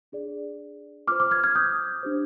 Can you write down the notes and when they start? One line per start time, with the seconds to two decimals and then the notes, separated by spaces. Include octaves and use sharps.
0.12 D4 G#4 D5
1.08 F4 D6 F6
1.12 C5
1.20 D6 F6
1.31 F6 G#6
1.44 F6 G#6
1.55 D#6 G6
2.03 D4 G4 C5